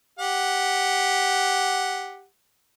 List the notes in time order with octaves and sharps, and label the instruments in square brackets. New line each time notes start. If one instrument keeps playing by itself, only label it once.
[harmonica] G4 F#5